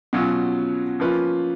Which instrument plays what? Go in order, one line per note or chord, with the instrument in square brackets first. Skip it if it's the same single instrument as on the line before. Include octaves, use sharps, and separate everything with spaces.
[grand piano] B2 F#3 C#4 F4
F3 A#3 C#4 F4 B4